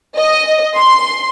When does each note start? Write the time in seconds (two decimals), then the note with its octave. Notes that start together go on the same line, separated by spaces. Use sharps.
0.18 D#5
0.76 C6